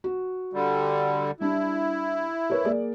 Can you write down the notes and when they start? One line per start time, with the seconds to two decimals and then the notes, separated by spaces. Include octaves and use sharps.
0.04 F#4
0.53 D3 G3
1.40 G3 D4 E4
2.50 A#4 B4 C#5
2.65 A#3 G#4 D5